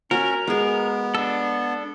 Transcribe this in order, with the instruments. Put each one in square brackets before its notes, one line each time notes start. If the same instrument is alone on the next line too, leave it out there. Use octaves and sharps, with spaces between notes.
[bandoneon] C#4 [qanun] F#4 [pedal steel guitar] A#4
[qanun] G#3 G#4 [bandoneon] B3
[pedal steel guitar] D4 A4